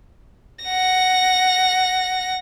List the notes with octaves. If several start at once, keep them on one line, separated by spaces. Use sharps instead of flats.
F#5 A#6